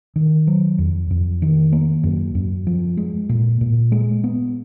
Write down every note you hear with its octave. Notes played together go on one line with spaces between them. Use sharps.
D#3
F#3
F2
F2
D#3
A#3
F#2
F#2
F3
G#3
A#2
A#2
G#3
B3